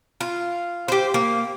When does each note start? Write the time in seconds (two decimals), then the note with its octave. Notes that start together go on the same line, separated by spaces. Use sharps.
0.21 F4
0.88 G4 C5
1.14 A#3